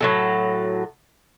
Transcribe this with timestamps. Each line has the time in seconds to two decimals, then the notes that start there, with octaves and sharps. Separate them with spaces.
0.01 A2 F#3 A4